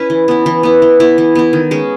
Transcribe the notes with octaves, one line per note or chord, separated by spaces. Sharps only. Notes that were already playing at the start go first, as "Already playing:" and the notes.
Already playing: C#4 E4 B4
E3
B3 E4
E3
B3 E4
E3
B3 E4
E3
B3 E4
D#3
G#3 C#4